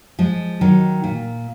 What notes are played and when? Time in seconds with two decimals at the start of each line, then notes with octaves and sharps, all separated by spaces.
0.19 F3 G#3
0.61 D#3 F#3
1.04 A#2